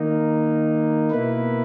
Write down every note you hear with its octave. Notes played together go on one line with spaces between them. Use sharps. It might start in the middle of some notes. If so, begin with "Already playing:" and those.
Already playing: D#3 A#3 D#4
B2 A#3 E4 B4